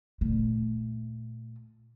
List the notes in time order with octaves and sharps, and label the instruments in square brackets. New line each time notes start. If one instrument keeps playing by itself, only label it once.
[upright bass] A#2 A3